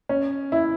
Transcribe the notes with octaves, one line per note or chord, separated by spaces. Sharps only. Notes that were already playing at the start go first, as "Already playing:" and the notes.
C#4
E4